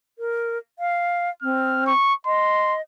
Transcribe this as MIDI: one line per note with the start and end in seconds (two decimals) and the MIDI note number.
0.19 0.58 70
0.79 1.30 77
1.43 1.93 60
1.43 1.82 89
1.87 2.14 85
2.26 2.81 75
2.26 2.75 84